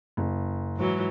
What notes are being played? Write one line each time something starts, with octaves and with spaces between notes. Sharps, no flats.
F#1
G#2 E3 F#3